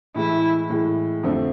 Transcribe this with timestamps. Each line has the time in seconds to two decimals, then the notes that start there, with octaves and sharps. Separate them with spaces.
0.15 A2 E3 G#3 E4
0.70 A2 E3 G#3
1.23 F2 D3 A3 C4